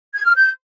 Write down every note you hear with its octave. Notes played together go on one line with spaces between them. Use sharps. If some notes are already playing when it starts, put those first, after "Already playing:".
G#6
F6
G6